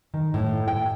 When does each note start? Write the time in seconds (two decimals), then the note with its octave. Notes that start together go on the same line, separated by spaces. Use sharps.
0.14 D#3
0.34 A2
0.68 G5